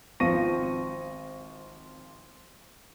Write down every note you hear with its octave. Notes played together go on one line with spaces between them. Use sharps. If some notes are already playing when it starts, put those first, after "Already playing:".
G#1 F3 C4 C#6 A#6 D#7